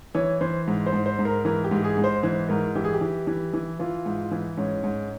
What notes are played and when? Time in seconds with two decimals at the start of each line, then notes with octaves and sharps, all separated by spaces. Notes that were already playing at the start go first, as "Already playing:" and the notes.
0.15 E3 C#5
0.41 E3 C5
0.67 G#2
0.86 C5
0.93 G#2
1.06 C5
1.19 G#2
1.25 A#4
1.45 E3 A#4
1.64 G4
1.71 G#2
1.84 G#4
1.98 G#2
2.04 C5
2.23 E3 C5
2.49 G#2 A#4
2.75 E3 G4
2.84 G#4
2.93 G4
3.01 E3
3.27 E3
3.53 E3
3.79 E3 F4
4.06 G#2
4.31 E3
4.57 G#2 C#4
4.84 G#2